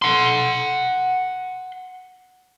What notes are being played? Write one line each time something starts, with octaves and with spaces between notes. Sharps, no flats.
F#5 C6